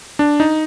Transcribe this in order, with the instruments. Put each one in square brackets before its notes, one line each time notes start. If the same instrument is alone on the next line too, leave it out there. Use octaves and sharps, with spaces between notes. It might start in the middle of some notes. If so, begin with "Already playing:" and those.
[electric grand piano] D4
D#4